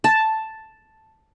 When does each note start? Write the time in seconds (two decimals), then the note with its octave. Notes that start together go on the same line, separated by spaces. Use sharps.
0.04 A5